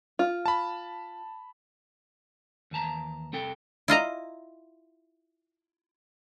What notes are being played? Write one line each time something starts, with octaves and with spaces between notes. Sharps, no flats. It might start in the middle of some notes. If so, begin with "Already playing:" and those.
F4
A5 B5
D#2 E3 A5 A#5
C2 C4 A4 G5
E4 F4 D#5 A#5